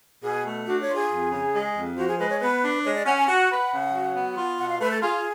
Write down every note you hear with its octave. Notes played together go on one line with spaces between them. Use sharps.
B2 G#4
A3
D4 F#4
C#5
F4
G#4
F2
C#3
G#3
F2
F3 F#4
G#4
G#3 B4
C#5
B3 B4
D4
G#3 C#5
D5
C#4 F#5
G#5
F#4 F#5
B4
C#3
F#3
B3
F4
B2 F#5
F5
A3 B4
A4
F4 G#4